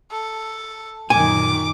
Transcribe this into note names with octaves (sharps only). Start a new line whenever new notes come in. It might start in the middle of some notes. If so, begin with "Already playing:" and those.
A4
F#2 A#2 D#3 G#5 D6